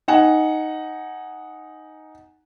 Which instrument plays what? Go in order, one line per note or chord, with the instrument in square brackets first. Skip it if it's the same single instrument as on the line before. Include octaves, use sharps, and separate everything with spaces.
[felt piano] D#4 F#5 G#5